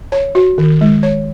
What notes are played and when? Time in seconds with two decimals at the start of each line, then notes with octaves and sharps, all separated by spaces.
0.12 C#5
0.35 F#4
0.58 D#3
0.81 G#3
1.03 C#5